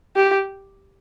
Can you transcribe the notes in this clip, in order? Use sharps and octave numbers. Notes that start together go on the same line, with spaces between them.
G4